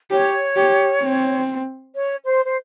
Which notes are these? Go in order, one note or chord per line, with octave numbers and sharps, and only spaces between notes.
G4 C#5
G4
C4
C#5
C5
C5